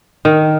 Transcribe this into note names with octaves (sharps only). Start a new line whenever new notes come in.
D#3